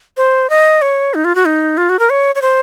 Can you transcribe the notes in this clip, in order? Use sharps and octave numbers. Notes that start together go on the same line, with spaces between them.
C5
D#5
C#5
D#4
F4
F#4
D#4
F4
F#4
A#4
C#5
C#5
C5